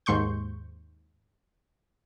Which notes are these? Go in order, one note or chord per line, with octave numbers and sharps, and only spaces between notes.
D#2 G#2 C6 C#6 G6